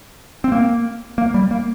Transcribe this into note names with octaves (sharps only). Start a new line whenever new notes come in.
C4
A#3
A#3
G3
A#3